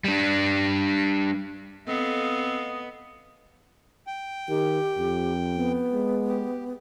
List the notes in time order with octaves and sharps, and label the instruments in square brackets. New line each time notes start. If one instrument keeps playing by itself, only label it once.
[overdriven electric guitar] G3 D4
[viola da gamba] B3 [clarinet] C4 [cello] A4 F5 [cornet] D#5
[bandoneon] G5
[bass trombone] D#3 [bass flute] G4
[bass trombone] F2
[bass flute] B3
[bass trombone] G#3
[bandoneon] G4